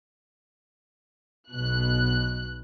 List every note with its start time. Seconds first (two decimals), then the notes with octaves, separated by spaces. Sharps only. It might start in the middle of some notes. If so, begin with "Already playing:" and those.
1.52 B1 B2 F#6